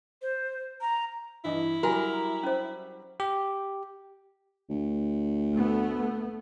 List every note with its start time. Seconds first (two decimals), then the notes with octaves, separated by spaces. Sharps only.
0.22 C5
0.81 A#5
1.45 G2 E3 E4 D#5
1.83 F#3 G3 F#4 A#4 G#5
2.43 C#4 C5
3.20 G4
4.70 D2
5.54 A3 B3